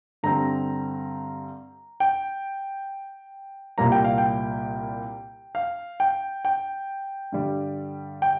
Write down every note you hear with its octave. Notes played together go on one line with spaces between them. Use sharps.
G2 D3 G3 C4 A#5
G5
C2 A#2 G3 A#3 A#5
G5
F5
G5
F5
G5
G5
G2 D3 G3
G5